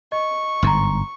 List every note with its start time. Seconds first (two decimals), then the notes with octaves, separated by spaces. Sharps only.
0.12 D#5 C#6
0.62 G1 G#2 A#5 C6